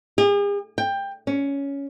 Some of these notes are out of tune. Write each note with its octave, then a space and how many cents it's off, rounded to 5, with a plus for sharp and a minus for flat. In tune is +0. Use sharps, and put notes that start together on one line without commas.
G#4 -45
G5 +15
C#4 +10